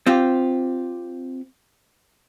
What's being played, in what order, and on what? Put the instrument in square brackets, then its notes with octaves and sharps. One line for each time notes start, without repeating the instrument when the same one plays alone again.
[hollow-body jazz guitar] C4 F4 G4